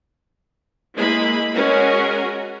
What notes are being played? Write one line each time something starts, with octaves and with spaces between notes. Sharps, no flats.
G#3 A#3 E4 B5
G#3 C#4 F#4 A#4